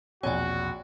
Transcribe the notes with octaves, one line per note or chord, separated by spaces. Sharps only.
A#1 E2 B2 C4 F#4 C#5 D5 G#5